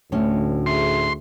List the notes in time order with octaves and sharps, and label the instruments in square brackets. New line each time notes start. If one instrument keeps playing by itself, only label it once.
[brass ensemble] D2 [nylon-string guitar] A2 C#4 [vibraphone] A3
[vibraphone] G#4 E5 [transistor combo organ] C6